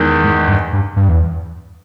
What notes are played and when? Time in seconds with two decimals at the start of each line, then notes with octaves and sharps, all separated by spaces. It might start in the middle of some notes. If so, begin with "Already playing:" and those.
Already playing: E2 D#3 G#3
0.24 G#2
0.48 G2
0.73 G2
0.96 G2
1.08 E2